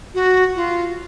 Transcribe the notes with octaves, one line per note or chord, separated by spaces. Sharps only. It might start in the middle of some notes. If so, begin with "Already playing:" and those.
F#4
F4